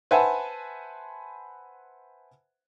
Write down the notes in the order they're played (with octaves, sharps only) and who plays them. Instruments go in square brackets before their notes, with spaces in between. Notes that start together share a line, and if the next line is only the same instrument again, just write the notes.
[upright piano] B4 C5 E5 F#5 G#5 A5